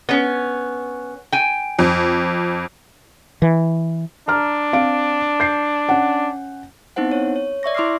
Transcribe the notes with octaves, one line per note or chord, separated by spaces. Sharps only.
B3 C#4
G5 G#5
F2
E3
D4 A#5 F6
C4 F5 D7
G6 C7
C#4 F#5
B3 C4 D#4 E4 C5 F#5
C#5
C#5
D5 E5 C#6 A#6
E4 C6 D6 E6 F6 C7